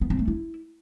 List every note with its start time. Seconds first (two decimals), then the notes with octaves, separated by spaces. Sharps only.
0.01 B3
0.10 C4
0.19 A3
0.28 E4